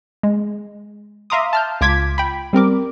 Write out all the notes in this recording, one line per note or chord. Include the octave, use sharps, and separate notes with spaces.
G#3
E5 F5 A#5 C6 D6 D#6
A5 F6 G6
C#2 F4 D6 G#6 B6
G5 B5
G3 C4 A#4 D6